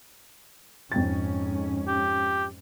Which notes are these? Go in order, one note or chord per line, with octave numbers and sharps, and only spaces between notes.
F2 G#2 C#4 G5 A6
G4